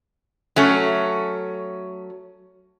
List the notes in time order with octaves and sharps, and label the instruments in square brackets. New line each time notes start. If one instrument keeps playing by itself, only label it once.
[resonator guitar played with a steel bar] F#3 A3 C#4